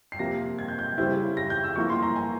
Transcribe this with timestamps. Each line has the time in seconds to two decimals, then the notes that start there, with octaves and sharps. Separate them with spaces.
0.12 C7
0.19 C3 F3 A#3 A#6
0.59 G#6
0.68 G6
0.79 G6
0.98 C#3 G3 C4 E4 G6
1.37 A#6
1.50 G6
1.64 E6
1.76 F3 A#3 E4 C#6
1.90 C6
2.02 A#5
2.16 G#5